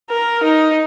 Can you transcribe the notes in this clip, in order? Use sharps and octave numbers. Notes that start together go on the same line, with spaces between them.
A#4
D#4